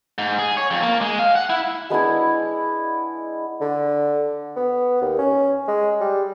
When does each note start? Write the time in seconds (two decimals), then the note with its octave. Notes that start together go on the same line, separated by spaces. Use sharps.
0.18 G#2
0.38 G#4
0.57 C#5
0.71 F2
0.83 A#3
1.01 G#3
1.19 F5
1.36 F#5
1.50 E4
1.90 G#3 B3 D4 E4
3.61 D3
4.56 B3
5.01 D#2
5.18 C#4
5.68 G#3
6.00 G3